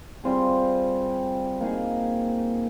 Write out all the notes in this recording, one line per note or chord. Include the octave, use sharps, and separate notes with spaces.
G3 C4 F4 G#4
A#3 D#4 G#4